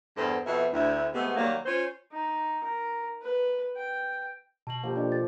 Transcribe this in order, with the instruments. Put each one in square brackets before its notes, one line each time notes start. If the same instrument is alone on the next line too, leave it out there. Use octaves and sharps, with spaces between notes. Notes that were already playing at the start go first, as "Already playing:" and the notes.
[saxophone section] E2 G2 B3 A4 C5
F2 B2 B3 E5
D2 E4
C3 G#3 A3 B3
D#3 F#3 G3 A#3
C#4 F4 C5
[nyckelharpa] D#4
A#4
B4
G5
[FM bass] B2 [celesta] A5 F#7
[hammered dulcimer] F3 A#3 [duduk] G4
[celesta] D4 D5 D#5 [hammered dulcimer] A4
[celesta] A6